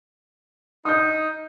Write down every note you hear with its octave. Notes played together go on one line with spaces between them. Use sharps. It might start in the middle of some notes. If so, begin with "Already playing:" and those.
D#4 D#6 G6